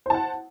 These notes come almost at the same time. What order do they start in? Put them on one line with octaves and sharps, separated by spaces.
C5 A5 F#5